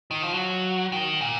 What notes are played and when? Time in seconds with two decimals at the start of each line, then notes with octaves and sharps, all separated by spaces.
0.11 D#3
0.22 F3
0.34 F#3
0.92 D#3
1.21 A#2